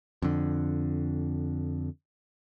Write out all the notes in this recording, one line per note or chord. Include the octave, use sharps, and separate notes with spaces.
F2 D3